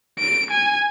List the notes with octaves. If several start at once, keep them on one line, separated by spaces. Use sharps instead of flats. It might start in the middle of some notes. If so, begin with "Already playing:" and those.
D7
G#5